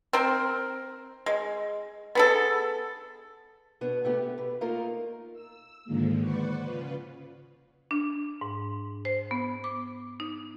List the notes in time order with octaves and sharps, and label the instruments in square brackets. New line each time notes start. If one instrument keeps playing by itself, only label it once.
[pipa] C4 A#4
G#3
B3 G#4 A4
[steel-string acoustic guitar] B2 B3 D4
C3 A3 B3 G4
G4
B2 B4
A3 A#3 D#4 F4 A#4
[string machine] E6
G#2 D3 D#3 F3 G#3 A#3
B4 C5 D5 F#5 C#6
C#3 F4 B4
[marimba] D4
G#2
C5
B3
D6
D#4